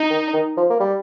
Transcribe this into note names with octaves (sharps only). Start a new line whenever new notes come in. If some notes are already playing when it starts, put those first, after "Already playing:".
Already playing: D#4
D#3
D#3
F3
A#3
G3